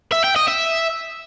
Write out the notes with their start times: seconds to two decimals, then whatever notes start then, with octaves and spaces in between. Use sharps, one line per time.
0.13 E5
0.24 G5
0.36 D#5
0.48 E5